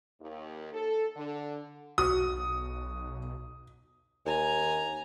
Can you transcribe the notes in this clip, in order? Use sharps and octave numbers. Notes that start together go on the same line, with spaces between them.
D#2
A4
D3
B1 F#4 D#6
D#2 G#5 A#5